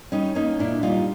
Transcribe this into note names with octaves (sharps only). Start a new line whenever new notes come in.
G3 C#4 D#4
A#3 C#4 D#4
A#2 D4 E4
G3 D#4 F4